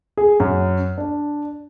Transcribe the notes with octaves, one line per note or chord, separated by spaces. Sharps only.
G#4
F#2
D4